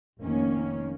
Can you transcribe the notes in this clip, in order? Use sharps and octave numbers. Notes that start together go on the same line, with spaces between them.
F1 D#3 A#3 C#4